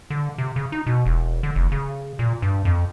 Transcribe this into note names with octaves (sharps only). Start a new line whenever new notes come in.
D3
C3
C#3
D#4
B2
E1
D3
F1
C#3
A#2
G2
F2